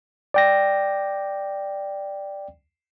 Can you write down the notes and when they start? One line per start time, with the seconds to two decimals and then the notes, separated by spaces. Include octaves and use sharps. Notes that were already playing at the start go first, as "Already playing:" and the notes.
0.34 D5 G5 A#6